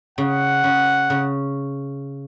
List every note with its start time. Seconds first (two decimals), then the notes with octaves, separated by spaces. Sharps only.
0.18 C#3 F#5
0.64 C#3
1.10 C#3